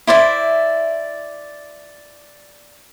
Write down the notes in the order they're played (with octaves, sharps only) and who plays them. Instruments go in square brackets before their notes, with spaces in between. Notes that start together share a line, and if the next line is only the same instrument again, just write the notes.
[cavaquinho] E4 C5 D5 E5